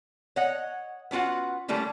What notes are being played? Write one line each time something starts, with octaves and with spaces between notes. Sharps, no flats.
C#5 D#5 F#5
B3 C#4 F4 F#4 F#5
D3 G3 A3 A#3 C#4 E4